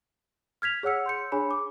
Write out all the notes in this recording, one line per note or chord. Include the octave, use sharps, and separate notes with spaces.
F6 G#6 B6 F7
G#4 C#5 F#5 E6 C#7
C6 G6 C#7
D4 G#4 C#5 G#5 B5
D6